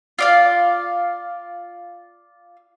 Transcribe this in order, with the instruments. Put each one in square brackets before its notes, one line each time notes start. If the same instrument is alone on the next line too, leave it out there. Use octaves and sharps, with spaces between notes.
[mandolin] F4 D5 F5